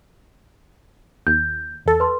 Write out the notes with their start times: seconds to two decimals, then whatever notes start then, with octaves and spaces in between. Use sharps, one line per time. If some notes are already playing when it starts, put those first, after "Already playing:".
1.27 D#2 G6
1.86 E2 A4
2.00 B4 C6